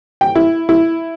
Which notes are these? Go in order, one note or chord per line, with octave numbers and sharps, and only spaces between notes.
G5
E4
E4